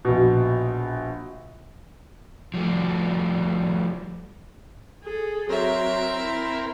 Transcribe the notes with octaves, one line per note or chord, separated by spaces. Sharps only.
A#1 B2
F3 G3 A3
G#4 A4
F#3 C4 A#4 E5
E4